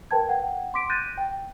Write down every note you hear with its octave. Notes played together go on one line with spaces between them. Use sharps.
A#4 B4 G5 A5 G#6
F#5 G5
C6 D6 B6 D7
F#6 G6 A6 A#6 D#7
G5